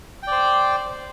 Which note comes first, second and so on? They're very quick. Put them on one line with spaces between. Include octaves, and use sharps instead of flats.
G5 D5 C5